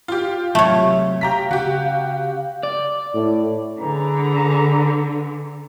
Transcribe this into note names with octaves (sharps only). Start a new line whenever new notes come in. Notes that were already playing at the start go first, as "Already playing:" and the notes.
F4 G4
C3 F#3 A3 C#5
G4 F5 A#5 B6
C#3 F#4 G4
D5
A2
D3 G#4 B4 A#5